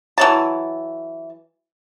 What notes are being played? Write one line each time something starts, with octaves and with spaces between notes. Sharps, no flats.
E3 F#3 A5